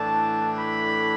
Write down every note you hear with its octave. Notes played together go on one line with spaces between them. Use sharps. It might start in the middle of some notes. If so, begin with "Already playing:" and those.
Already playing: A2 E3 A3 D4 A5
B5